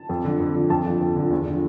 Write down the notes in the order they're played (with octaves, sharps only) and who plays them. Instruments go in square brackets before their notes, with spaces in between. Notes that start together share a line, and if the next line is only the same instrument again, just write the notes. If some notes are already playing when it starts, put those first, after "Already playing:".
Already playing: [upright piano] A5
F2
D3 F3
F2
D3 F3
F2 A5
D3 F3
F2
D3 F3
E2
D3 F3